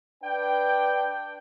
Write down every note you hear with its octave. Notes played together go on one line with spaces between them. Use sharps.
D4 B4 G5